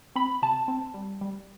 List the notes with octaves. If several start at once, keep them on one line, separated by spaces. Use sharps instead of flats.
C4 B5
C3 A5
C4
G3
G3